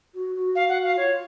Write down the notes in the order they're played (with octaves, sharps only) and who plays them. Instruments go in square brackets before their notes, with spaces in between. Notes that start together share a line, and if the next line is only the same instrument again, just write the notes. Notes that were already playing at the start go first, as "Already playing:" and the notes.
[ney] F#4
F#4
[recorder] F5
F#5
F5
[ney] F4 [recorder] C#5